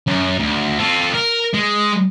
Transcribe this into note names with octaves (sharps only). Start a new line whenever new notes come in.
F#2
D2
F4 A4
A#4
G#3